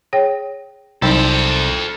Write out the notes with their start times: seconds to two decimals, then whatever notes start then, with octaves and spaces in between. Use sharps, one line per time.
0.13 G#4 C#5 G5
1.02 C2 F#3 C4 D#4 A4 C5 G5